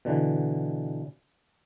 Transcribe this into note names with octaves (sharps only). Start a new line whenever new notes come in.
B2 D3 E3